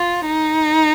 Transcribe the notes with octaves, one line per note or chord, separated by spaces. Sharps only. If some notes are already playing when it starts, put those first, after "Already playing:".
Already playing: F4
D#4